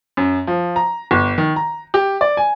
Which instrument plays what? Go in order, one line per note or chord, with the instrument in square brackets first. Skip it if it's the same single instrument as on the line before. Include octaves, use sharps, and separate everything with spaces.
[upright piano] F#2
F3
A#5
G1
D#3
A#5
G4
D5
G#5